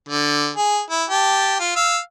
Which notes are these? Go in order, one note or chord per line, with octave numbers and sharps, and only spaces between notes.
D3
G#4
E4
G4 A5
F4
F5 E6